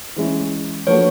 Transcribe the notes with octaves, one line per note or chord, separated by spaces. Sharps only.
E3 G#3 C#4 E4
F3 A#3 D4 F#4 A4 B4 C#5